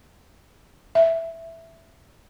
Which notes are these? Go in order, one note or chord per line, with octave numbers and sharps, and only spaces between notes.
E5